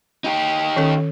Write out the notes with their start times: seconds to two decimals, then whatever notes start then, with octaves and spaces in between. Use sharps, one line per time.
0.24 D#4 G4
0.76 D#3 C#4 A4